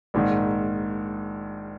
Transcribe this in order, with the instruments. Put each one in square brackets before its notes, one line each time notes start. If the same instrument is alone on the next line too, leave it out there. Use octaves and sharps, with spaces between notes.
[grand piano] A#1 G#2 D#3